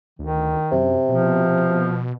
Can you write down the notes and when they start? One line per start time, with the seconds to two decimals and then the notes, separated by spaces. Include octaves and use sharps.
0.19 D2 D#3
0.72 F#2 C3
1.09 B2 F3